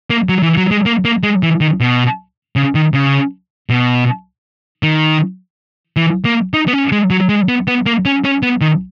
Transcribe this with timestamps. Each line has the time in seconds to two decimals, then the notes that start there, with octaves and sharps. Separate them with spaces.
0.10 A#3
0.29 F#3
0.43 E3
0.57 F#3
0.71 G#3
0.86 A#3
1.05 A#3
1.23 G#3
1.43 E3
1.61 D#3
1.80 B2
2.56 C#3
2.75 D#3
2.94 C#3
3.70 B2
4.83 D#3
5.97 E3
6.25 A#3
6.54 D#4
6.68 B3
6.73 C#4
6.92 G#3
7.10 F#3
7.29 G#3
7.48 B3
7.68 B3
7.86 A#3
8.05 C#4
8.24 C#4
8.43 B3
8.61 D#3